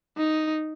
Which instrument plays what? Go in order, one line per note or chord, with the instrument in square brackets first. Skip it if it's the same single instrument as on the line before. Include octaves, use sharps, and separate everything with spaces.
[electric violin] D#4